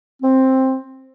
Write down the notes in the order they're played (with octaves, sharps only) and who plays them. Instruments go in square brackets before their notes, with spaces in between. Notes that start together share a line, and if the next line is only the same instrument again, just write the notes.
[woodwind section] C4